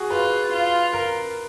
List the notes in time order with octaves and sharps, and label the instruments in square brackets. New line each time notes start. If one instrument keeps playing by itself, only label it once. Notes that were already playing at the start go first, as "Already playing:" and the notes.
Already playing: [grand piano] F#4 G#4
[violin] F4 [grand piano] B4
[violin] F4
[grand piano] A#4